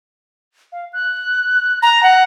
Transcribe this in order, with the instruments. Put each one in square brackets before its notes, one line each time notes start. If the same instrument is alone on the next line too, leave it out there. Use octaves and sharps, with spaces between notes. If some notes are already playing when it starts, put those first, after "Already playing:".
[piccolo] F5
F#6
[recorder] A#5 [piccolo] A#6
[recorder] F#5